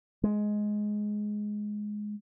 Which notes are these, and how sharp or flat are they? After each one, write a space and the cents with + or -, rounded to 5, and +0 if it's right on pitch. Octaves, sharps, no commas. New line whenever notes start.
G#3 +10